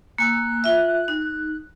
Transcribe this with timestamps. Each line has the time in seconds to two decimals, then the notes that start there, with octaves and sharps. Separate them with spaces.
0.18 A#3 G#5 E6 F#6
0.64 F4 E5
1.08 D#4